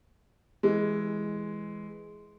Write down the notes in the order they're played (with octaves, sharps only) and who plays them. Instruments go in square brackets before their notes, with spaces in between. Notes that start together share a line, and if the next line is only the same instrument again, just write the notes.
[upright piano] E3 G#3